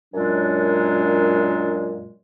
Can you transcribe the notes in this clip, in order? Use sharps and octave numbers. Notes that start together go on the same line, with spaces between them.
F#2 A#2 F#3 G#3 D4